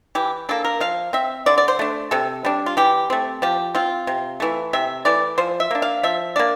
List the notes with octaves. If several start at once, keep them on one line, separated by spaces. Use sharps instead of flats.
E3 G4
A#3 D4 A4
A#4
F3 F5
C4 E5
D3 D5
D5
C5
A3 D4
C3 A4
G3 D4
F4
E3 G4
A3 C4
F3 G4
C4 F4
C3
E3 A3
C3 E5
E3 A3 D5
F3 C5
E5
A#3 D4
F5
F3 E5
A#3 D4 D5